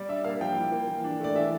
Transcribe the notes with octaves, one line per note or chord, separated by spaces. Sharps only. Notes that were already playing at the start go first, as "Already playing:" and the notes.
Already playing: G3 D5
D4 E5
A#3 F5
F3 G5
E4
A#3
E3
D4
A3 D5
E3 E5